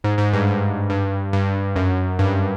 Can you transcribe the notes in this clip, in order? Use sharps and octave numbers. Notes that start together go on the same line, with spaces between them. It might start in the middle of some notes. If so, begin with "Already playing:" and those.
G#2
G#2
G2
G2
G2
G2
F#2
G2